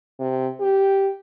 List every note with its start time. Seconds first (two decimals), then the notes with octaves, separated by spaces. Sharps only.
0.19 C3
0.60 G4